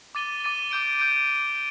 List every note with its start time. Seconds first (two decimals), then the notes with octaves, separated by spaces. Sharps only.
0.15 D6 A6 D#7 G7
0.43 D6 A6 D#7 G7
0.71 D6 G6 D7
1.00 D6 G6 D7